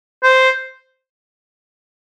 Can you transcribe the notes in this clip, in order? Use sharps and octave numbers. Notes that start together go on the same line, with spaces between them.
C5